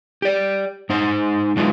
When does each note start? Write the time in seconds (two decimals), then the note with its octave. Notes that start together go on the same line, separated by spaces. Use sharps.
0.22 G4 D5
0.89 G#2 D#4 C5
1.57 F#3 G#3 D#4 F4 B4